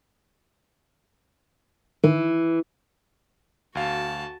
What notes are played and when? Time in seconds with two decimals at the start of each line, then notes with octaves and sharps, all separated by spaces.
2.04 D#3 E3
3.75 D2 F#4 F5 A5